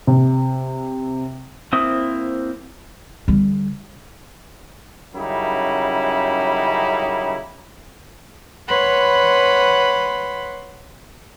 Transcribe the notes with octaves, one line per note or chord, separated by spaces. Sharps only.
C3
A#3 C4 E4 C5 D#6
D3 G3
F#2 C#3 G3 D#4 E4
B4 C#5 F#5 B5 C6